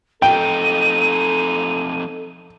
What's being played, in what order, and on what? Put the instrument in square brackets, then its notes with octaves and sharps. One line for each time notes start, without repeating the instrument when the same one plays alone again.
[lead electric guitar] F2 D#4 [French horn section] A4 [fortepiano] G5 [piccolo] D#7